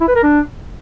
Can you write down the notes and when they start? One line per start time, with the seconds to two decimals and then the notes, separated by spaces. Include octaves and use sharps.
0.01 E4
0.08 B4
0.16 A#4
0.23 D4